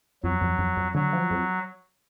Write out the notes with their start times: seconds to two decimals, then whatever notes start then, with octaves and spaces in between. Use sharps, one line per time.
0.23 F2 F#3
0.41 F2
0.59 F2
0.77 F2
0.95 D3 F#3
1.13 F3
1.31 F2